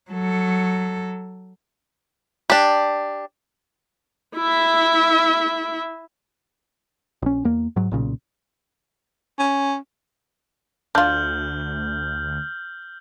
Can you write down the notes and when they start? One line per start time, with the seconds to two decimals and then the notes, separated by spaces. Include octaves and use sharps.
0.11 F#3 A4
2.50 D4 G4
4.36 E4 E5
7.22 A#1 C#4
7.45 E2 A#3
7.76 G#2 F#3
7.91 B1 A#2 C#3
9.39 C#4
10.95 D2 D4 F4 F6 G6 F#7